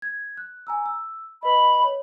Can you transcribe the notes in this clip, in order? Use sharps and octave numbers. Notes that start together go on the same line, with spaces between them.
G#6
F#6
G#5 A#5 E6
E6
B4 D#5 B5
C#5